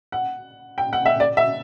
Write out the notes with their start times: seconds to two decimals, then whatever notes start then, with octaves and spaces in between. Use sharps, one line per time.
0.12 F#5
0.78 G5
0.93 F#5
1.06 E5
1.20 D5
1.37 E5